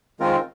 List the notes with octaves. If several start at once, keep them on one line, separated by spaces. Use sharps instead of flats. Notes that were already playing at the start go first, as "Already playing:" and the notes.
D#3 G#3 C4 F4 A#4